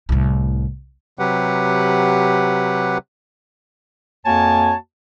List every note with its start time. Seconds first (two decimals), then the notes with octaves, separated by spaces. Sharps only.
0.09 C2 A2
1.19 C3 F#3 G4 B4 F#5
4.26 F2 A#3 F#4 C#5 G#5 A5